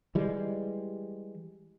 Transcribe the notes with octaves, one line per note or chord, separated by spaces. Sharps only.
E3 G3 G#3